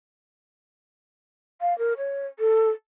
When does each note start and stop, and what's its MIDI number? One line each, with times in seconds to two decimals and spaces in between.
1.61 1.76 77
1.78 1.93 70
1.98 2.26 73
2.39 2.69 69